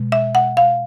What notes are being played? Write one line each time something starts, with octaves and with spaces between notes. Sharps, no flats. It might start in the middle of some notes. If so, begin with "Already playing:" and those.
Already playing: B2 G#3
E5
F#5
F5